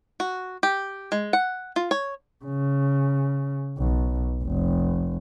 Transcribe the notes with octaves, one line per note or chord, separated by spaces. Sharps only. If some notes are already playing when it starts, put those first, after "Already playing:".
F#4
G4
G#3
F#5
F4
C#5
C#3
B1
F1